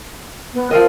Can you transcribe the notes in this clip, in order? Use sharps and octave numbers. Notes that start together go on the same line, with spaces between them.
B3
F3 C4 A#4 D#5